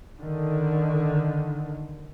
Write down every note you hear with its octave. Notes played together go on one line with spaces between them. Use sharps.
D3 D#3